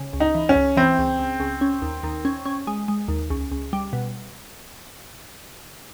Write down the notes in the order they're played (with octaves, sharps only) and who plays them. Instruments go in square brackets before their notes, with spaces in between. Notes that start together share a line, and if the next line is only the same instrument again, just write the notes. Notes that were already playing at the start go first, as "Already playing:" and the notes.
Already playing: [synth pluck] C#3
C#2
[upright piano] D#4
[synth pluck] E3
[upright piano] C#4
[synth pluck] C#2
[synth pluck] E3 [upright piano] C4
[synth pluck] C#2
C#2
C#2
C#4
D#2
D#2
C#4
C#4
G#3
G#3
D#2
C#2
C#2
G3
B2